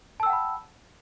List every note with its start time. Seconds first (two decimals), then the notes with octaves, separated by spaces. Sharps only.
0.20 A5
0.23 E6
0.26 G5
0.30 F#5
0.33 B5